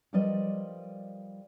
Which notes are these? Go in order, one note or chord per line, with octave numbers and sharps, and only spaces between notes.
F3 G3 A#4 B4 D5 D#5